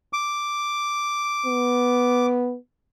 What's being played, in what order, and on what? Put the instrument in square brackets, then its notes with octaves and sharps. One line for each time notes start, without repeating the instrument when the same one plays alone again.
[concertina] D6
[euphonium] B3